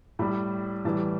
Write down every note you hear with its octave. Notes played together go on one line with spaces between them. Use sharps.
A2 G3 B5
A2 E3 G3 A5